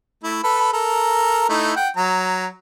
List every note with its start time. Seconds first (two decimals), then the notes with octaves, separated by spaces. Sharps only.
0.24 A3 E4
0.44 A4 B4 B5
0.73 A4 A#4 A#5
1.49 A3 D#4 E4
1.76 F#5 G5
1.97 F#3 A#5